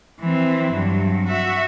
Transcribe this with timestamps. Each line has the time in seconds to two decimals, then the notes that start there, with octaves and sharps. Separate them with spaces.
0.20 E3 C4
0.74 G2 F#3
1.27 F#4 E5